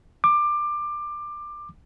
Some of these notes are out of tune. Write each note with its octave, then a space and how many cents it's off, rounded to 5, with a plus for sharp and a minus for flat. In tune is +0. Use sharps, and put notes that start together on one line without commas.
D6 +20